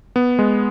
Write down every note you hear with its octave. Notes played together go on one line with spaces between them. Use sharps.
B3
G#3